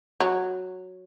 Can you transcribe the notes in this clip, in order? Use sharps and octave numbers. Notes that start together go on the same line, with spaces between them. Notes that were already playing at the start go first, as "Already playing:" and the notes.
F#3